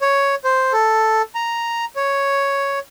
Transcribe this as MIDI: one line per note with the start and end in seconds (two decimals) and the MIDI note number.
0.02 0.35 73
0.44 0.72 72
0.73 1.22 69
1.35 1.85 82
1.96 2.79 73